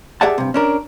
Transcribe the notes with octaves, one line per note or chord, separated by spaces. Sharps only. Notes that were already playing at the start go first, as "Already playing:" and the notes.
G4 G#4 D5 E5 F#5 A5
G2 C3
C#4 D4 A#4